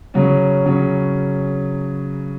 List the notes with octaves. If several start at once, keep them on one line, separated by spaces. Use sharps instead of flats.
C#3 F#3 C#4
C#3 F#3 C#4